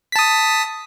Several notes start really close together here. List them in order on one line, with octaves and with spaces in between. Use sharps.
B6 A5 D#6